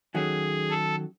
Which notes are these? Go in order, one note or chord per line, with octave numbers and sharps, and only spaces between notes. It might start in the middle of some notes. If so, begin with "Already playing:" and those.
D#3 F#3 A3 C#4 G#4
A4